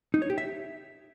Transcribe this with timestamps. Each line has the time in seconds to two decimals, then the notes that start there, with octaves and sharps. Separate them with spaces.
0.14 D#4
0.22 C#5
0.30 G4
0.38 E5